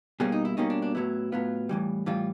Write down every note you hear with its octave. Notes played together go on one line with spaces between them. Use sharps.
B2 G3 A#3 C#4 G#4
D#4
E4
B2 G3 A#3 C#4 D#4
D4
D4
A2 F#3 B3 E4
A2 F#3 B3 F4
A2 E3 G3
A2 E3 G3 F4